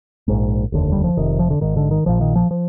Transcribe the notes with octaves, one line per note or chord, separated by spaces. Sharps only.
A#1 G#2
F1 D#2 D3
G3
F3
F1 F2 C3 D#3
F3
D3
G#1 G#2 D#3
D3
D#3
A#1 A#2 F3
D#3
F3
F3